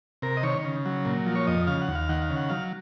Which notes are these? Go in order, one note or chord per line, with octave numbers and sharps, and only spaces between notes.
C3 A#4
D#5
D#3 C#5
C#3
F#3
A#2
F3
C#5
F2 D#5
C#3 F5
F#5
D#2
F5
D#3 F#5
F5
C#3
F#5
F#3 F5